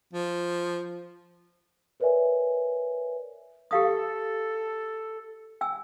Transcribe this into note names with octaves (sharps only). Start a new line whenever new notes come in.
F3
A#4 B4 C#5 D5 E5 G#5
G4 A4 F5 D#6
G5 G#5 E6